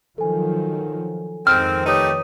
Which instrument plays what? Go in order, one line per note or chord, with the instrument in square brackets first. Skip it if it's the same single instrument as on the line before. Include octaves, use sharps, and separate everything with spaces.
[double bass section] D#3 F3 F#3 [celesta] A4 G#5
[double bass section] F2 D#3 [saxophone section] G#2 C4 [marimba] F6
[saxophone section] A3 D#4 G4 [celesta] B4 C#5 D#6